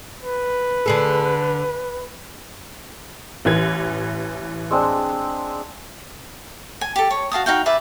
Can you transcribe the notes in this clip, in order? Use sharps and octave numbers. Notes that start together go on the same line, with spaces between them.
B4
D3 G#4 A4
A1 E3 G#6
G#3 C4 D4
G#5
G4 A4
C#5
F#4 F5 A5 D#6
D#4 F#4 F5 G5
G#4 B4 D5 E5